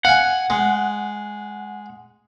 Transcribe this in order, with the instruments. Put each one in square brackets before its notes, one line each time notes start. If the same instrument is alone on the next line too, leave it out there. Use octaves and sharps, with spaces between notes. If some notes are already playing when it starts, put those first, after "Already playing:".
[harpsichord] F5 G#5 [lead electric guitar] F#5
[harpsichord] G#3